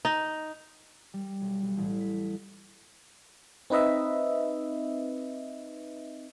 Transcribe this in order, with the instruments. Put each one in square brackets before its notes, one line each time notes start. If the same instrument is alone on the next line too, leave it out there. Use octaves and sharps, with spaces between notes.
[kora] D#4
[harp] G3
B1
B1
A1
B6
[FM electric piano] C4 D#4 B4 D#5 E5